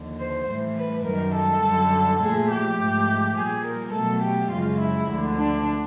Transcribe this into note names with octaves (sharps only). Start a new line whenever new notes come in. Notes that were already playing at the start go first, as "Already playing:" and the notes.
Already playing: D#2 D3 F3
C5
A2 E3 G3
B4
F#2 D#3 G3 A#4
A4
F#2 D3 G3
A#2 F3 A3 G#4
G4
G#2 F3 A3
A#2 G3 G#4
A#4
B2 F#3 A3 A4
G4
F#2 C#3 F3 G#3 F4
E4
D2 D3 F3
D4